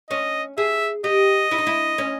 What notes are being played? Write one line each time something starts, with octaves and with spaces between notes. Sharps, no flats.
C#4 D#5
G#4 E5
G4 D#5
E4
D#4
E4
C#4